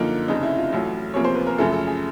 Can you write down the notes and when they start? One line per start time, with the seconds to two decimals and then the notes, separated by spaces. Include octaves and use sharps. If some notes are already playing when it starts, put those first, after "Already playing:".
Already playing: F#2 D3 F3 A#3 D#4
0.28 F1 F2 C#3 D#4
0.43 E4
0.58 F4
0.72 A1 A2 F#3
1.14 E2 C3 F3 A#3 C#5
1.25 C5
1.35 B4
1.47 A#4
1.58 F#2 C#3 F3 A3 A4
1.72 A4
1.87 G#4